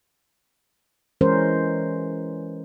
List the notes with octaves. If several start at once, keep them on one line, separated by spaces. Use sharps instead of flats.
E3 G#3 C#4 A#4 C5